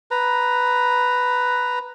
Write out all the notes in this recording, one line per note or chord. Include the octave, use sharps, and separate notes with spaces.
B4 A#5